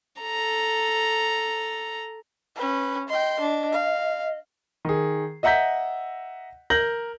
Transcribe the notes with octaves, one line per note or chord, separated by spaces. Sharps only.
A4 A#5
C#4 B4
D#5 G5 C6
D4
F5
D#3 G#4
D#5 E5 F#5 A#5 G6 B6
A#4 G6 A#6 F#7